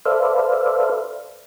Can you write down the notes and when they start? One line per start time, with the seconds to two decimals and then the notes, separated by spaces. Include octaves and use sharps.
0.06 A4 B4 C5 D5 E5 F5